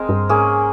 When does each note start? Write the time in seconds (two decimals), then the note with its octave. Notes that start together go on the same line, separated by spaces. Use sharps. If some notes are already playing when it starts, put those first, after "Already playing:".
Already playing: G#3 C4 A#4
0.09 G2
0.29 G#2 A#3 C#4 G#4